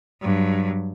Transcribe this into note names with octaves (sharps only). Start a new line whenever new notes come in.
G2 F#3